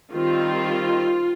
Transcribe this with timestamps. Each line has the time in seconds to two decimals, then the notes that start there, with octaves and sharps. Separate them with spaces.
0.11 D#3 G3 C4 F4